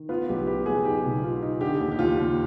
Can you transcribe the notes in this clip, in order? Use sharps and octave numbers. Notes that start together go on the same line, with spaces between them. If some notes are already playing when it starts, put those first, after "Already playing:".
Already playing: D#3
B3 F4
B1 G4
B3 G4
B1 G#4
D#4 G4
B2
D#4 F4
D#4
D3 G4
D#2
G4
D#2 F4
D#2